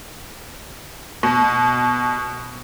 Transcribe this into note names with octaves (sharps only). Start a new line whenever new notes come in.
B2